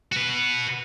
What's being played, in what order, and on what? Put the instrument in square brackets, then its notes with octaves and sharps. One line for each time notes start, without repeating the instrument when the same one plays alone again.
[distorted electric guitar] F#4 B4